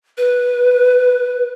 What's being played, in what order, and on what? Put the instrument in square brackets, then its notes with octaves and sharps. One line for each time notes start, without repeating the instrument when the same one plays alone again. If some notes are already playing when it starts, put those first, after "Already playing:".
[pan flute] B4